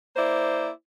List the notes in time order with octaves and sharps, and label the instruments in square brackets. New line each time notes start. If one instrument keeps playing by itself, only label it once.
[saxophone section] A#3 E4 C5 D5